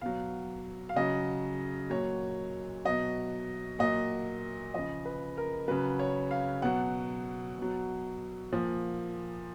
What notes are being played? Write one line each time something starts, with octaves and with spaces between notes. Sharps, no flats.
B2 F#3 F5
F5
C#3 F#3 D#5
A#2 F#3 C#5
B2 F#3 D#5
A#2 F#3 D#5
C#3 F3 D#5
B4
A#4
C#3 F#3 B4
C#5
F5
B2 F#3 F#5
B2 F#3
A#2 F3